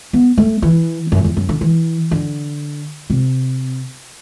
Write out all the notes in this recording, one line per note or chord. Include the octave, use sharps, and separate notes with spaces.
B3
A3
E3
F#2
E2
F#2
D3
E3
D3
C3